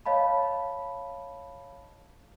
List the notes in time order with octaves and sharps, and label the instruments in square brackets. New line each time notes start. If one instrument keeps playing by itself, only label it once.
[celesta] C#5 D#5 F5 A5 B5